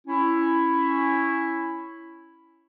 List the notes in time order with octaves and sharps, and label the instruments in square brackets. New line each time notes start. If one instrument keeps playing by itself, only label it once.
[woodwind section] C#4 E4